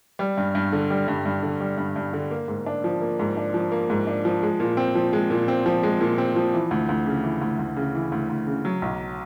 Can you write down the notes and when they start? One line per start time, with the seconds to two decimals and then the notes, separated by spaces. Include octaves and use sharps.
0.19 G3
0.37 G2
0.55 G2
0.72 D3
0.90 G3
1.08 G2
1.26 G2
1.43 D3
1.60 G3
1.78 G2
1.96 G2
2.13 D3
2.31 A#3
2.48 G#2
2.66 D4
2.84 F3
3.02 A#3
3.19 G#2
3.37 D4
3.54 F3
3.72 A#3
3.90 G#2
4.07 D4
4.25 F3
4.43 G#3
4.60 A#2
4.77 C4
4.95 F3
5.13 G#3
5.30 A#2
5.48 C4
5.66 F3
5.83 G#3
6.01 A#2
6.18 C4
6.36 F3
6.54 E3
6.71 D2
6.89 D2
7.06 C#3
7.24 E3
7.41 D2
7.59 D2
7.76 C#3
7.95 E3
8.12 D2
8.29 D2
8.47 C#3
8.65 F#3
8.82 B1